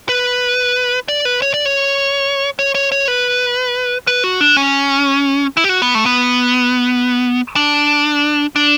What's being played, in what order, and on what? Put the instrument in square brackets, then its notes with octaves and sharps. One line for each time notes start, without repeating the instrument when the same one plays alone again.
[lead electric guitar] B4
D5
B4
C#5
D5
C#5
C#5
C#5
C#5
B4
B4
F#4
D4
C#4
E4
G4
F#4
B3
A3
B3
D4
D4